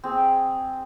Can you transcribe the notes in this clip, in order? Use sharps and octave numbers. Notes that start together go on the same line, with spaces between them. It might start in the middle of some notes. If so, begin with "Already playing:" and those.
C4 G#4